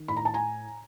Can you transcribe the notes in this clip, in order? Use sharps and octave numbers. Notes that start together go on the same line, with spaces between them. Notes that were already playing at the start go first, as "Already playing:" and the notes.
Already playing: D#3
A2 B5
A#5
A5
G#5 A#5